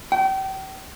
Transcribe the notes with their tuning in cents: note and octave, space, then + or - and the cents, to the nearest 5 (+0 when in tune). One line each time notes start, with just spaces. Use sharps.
G5 -35